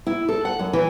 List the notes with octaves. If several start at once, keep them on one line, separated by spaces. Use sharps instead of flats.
E4
A4
F#5
F#2
E3